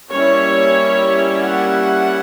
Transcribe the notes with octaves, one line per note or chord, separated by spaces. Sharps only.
G3 A#3 C#4 E4 C#5
F#5